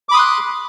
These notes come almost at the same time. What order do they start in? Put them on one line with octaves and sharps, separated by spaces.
D6 B5 D#6 C6 F#6